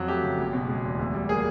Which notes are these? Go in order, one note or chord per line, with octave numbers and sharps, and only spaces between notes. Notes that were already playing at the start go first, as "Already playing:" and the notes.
Already playing: F2 F#3
A3 G4
C#3
F#1
B2
G#3
E2
D2
G3
A#3 G#4